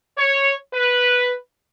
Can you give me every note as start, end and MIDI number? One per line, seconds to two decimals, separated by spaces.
0.17 0.52 73
0.74 1.33 71